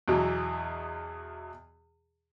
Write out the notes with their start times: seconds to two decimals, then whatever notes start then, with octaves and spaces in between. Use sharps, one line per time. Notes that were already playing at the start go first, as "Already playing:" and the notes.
0.08 E2 B2 E3 F#3